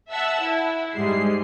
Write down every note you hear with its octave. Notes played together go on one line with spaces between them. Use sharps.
E5 F#5 A5 E6
E4
G#2 G3 G#3 C7